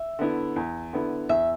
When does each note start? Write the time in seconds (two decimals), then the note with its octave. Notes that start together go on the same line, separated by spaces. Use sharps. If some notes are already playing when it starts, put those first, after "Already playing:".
Already playing: E5
0.19 D3 B3 E4
0.56 E2
0.93 D3 B3 E4
1.29 E2 E5